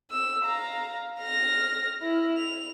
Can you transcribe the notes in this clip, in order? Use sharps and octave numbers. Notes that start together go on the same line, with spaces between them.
E6
F5 A#5
F6 A#6
E4
F7